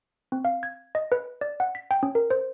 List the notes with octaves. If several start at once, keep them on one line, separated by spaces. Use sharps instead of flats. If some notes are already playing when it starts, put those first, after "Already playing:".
C4
F5
G#6
D#5
B4
D5
F#5
B6
G5
C#4
A#4
C5